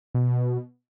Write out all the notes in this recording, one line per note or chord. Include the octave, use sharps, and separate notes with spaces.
B2